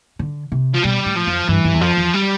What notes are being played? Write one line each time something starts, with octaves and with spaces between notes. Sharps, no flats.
D3
C3
F3
B2 G3
A2
F3
F2
G2 E3
G2
E2
F2 F3
E2
G3